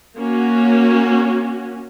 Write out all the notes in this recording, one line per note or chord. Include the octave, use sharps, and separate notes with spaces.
A#3 C#4 F#4